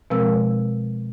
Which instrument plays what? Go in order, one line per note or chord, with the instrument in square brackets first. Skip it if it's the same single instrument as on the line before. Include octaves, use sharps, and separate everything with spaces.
[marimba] B2 F3 G#3 C4 A#4 E6